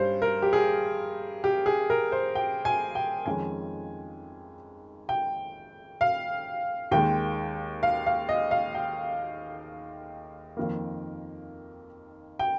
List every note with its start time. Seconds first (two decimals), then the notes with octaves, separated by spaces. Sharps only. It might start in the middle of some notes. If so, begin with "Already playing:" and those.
Already playing: G2 G3 C#4 C5
0.22 A#4
0.42 G4
0.53 G#4
1.44 G4
1.66 G#4
1.90 A#4
2.12 C5
2.35 G5
2.65 G#5
2.95 G5
3.26 F2 D#3 G#3 C#4 G#5
5.09 G5
6.01 F5
6.91 D#2 D#3 G#3 G5
7.83 F5
8.06 F5
8.29 D#5
8.51 F5
8.75 G5
10.57 F2 D#3 A#3
12.39 G5